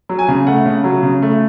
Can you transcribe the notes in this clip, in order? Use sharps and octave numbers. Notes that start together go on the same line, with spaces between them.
F#3
G#5
C#3
A3 F#5
C#3
F#3
C#3
A3